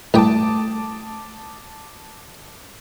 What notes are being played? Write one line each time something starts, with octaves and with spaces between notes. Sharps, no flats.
A1 G2 A3 G5 A5 D6 D#6